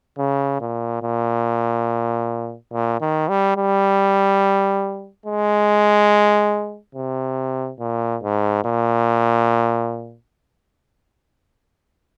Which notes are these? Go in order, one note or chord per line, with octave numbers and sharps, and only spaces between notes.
C#3
A#2
A#2
A#2
D#3
G3
G3
G#3
C3
A#2
G#2
A#2